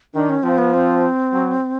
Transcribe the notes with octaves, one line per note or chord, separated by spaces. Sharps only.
D#3 D4
C#4
F3 C4
B3
C4
F#3